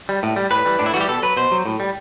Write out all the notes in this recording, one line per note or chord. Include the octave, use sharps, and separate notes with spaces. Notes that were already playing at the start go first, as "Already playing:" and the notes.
G3
A2
G3
A2 B4
E3 G3
A2 D4
E4
E3 G3 F#4 G4
B2 A4
F#3 B4
B2 C5
F#3
A2
G3